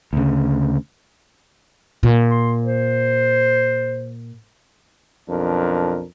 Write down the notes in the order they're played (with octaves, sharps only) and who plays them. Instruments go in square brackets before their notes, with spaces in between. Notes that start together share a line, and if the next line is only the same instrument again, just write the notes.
[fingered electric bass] D2 C#3
[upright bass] A#2
[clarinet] C6
C5
[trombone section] B1 F2 D4 A#4